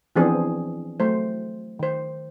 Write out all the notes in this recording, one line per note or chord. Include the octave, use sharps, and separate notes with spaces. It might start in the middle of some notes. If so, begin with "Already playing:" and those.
E3 F3 B3 C4 D4 G#4
F#3 A3 C5
D#3 C5